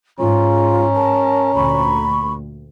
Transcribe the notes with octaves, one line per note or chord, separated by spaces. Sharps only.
G#2 C#4 F4 A#5
A#4 A5
D2 A#2 B5 C#6